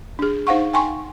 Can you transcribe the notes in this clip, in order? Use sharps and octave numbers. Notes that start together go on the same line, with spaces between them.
D4 G#4
D#4 C5 F5 F#5 C#6
G5 G#5 C6 C#6